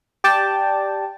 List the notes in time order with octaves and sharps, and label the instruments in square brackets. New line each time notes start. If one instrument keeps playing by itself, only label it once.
[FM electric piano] G4 D5 G5 A5